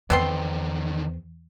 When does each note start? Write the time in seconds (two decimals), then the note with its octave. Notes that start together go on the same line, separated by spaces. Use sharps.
0.10 E2 D3 D#3 B3 C4 C6